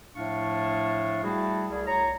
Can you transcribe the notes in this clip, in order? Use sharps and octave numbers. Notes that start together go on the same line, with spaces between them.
A2 F3 A3 D4 F5 C#6
G3 A3 E4 F#4 G#4
C2 G3 G#4
C2 C#5 A#5